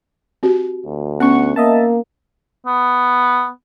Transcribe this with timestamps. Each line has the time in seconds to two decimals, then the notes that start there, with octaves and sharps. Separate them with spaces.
0.43 C4 F#4 G4
0.86 D2
1.20 B3 C#4 F#5 C#6
1.56 A#3 D#5 E5 A5
2.66 B3